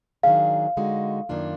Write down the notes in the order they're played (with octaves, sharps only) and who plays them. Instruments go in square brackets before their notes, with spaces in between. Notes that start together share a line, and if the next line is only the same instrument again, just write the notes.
[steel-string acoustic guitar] D#3 F#3 D4 G#4 [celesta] F5
[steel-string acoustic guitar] D3 G#3 D#4 F#4
F#2 D#3 A#3 D4 F4